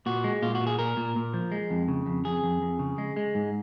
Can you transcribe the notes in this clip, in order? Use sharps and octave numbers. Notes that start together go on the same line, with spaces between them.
A#2 F#4
G#3
A#2 F4
F#4
A#2
G#4
A#2 A#4
A#2
A#2
F3
G#3
F2
C#3
F2
F2 G#4
F2
F2
C#3
G#3
G#3
G#2